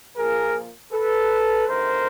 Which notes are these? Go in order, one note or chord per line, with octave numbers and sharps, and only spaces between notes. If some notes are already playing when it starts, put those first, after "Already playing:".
A#2 F3 A#3 G#4 A#4
A4 B4
D2 C3 D#3 A#4 C5